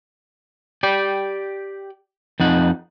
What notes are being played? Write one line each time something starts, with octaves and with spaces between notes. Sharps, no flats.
G4 D5 G5
F2 D#4 F#5